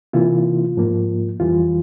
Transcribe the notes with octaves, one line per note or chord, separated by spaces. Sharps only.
C3 E3 A#3 E4 F4
G#2 F3 A#3
F2 E3 G3 F4